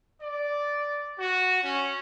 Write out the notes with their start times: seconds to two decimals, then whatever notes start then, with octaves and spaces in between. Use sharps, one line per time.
0.22 D5
1.19 F#4
1.62 C#4